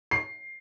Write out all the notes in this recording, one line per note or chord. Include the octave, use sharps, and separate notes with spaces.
C7